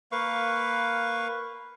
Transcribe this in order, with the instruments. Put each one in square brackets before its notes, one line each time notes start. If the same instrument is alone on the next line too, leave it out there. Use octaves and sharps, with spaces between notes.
[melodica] A#3 B4 F5 C#6